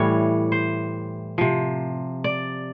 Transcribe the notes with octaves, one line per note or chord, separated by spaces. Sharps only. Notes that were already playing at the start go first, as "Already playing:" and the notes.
Already playing: A2 E3 G3 C#5
C5
C3 F3
D5